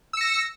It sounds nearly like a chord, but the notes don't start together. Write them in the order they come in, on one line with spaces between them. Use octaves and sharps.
E6 C#7 A#6